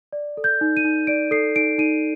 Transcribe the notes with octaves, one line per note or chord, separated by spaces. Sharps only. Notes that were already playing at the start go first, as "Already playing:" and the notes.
D5
A4
G6
D#4
D#7
D#4
D5 D7
A4 C7
D#4 D7
D#4 D#7